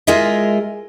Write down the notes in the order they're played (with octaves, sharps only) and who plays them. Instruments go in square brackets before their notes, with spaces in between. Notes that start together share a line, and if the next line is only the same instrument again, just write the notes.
[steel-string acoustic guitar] G#3 F4 G#4 A#4 D#5 E5